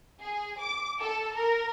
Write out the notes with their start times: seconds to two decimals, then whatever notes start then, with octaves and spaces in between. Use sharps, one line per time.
0.21 G#4
0.61 D6
1.00 A4
1.36 A#4